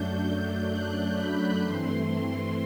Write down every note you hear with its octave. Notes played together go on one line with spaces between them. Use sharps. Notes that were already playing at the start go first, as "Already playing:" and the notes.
Already playing: F#2 F#3 A3 D4 G6
F#6
B5
G2 E3 A3 C4 C6
C6